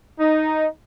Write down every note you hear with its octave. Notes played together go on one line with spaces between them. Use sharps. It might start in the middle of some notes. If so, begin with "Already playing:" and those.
D#4